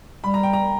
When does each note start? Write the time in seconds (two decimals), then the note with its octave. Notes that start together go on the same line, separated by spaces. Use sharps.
0.24 G3 B5
0.34 A#5
0.43 G5
0.53 A#5